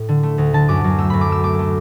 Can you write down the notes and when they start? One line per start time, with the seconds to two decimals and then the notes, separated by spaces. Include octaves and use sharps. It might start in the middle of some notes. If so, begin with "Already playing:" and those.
Already playing: A2
0.09 D3
0.23 A3
0.38 D2
0.53 D3 A5
0.69 F#2 D6
0.84 F#2
0.98 A3 E6
1.10 F#2 B5
1.21 D6
1.29 A3 E6
1.43 A3 D6
1.59 A3